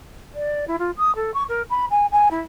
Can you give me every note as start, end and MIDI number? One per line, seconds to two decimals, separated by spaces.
0.34 0.65 74
0.68 0.76 64
0.79 0.91 65
0.97 1.15 87
1.15 1.31 69
1.34 1.44 85
1.49 1.62 70
1.70 1.85 83
1.90 2.06 80
2.12 2.28 80
2.31 2.40 64